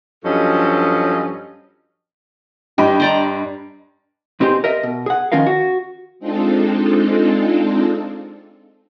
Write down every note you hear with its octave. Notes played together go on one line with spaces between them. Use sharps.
G2 F3 F#3 C#4 A4 D#5
G2 G4 D#5 B5
C5 D5 A#5
B2 C4 D#4 G4 G#4 C5
A#4 D#5 E5
B2
G#4 F#5
F2 D#3 C#4 F4 A#4 F5
F#4
G#3 C4 D4 D#4 F4 A4